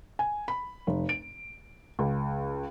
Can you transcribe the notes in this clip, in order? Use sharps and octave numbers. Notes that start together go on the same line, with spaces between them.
G#5
B5
F1
D7
C#2